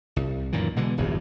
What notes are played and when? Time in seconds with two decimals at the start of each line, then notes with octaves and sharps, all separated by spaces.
0.16 C2
0.52 F#2 A#2 D#3 E3
0.76 B2 D3 E3 G#3
0.97 D1 G1 E2 G2